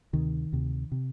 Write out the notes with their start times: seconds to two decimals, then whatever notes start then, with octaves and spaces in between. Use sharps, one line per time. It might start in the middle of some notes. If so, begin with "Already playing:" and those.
0.13 D2 C3 D#3
0.52 D2 C3
0.92 C3